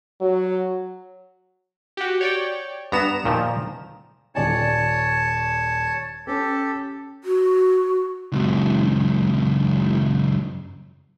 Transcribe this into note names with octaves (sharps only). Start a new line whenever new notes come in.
F#3
F#4 G4
C#5 D5 G5
G2 B3 A#5 E7
A#2 D#3 F3
D#1 C#5 D5 G#5 A5
C#4 G4 A4
F#4
C#2 F#2